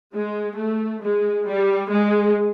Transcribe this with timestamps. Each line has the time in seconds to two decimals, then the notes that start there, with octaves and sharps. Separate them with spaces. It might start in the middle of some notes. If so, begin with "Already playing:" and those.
0.14 G#3
0.57 A3
1.02 G#3
1.46 G3
1.90 G#3